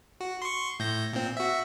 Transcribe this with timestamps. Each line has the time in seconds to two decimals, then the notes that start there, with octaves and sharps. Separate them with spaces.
0.21 F#4
0.42 C6 C#6
0.79 A2 G6 A#6
1.13 A#2 C4
1.37 F#4 E5